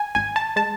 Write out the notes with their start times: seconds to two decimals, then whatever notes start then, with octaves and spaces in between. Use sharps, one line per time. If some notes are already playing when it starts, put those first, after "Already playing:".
Already playing: G#5
0.15 G#1 G#5
0.36 A5
0.56 G#3 A5